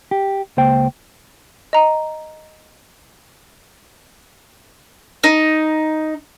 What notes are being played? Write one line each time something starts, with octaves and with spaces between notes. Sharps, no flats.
G4
C#2 A#3 C5 G5
D#5 A#5
D#4